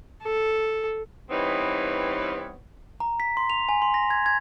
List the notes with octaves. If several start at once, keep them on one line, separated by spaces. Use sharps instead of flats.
A4
E3 G3 B3 C4 D#4 C#5
A#5
B6
C6
F7
G#5
C6
A#6
G#6
G#6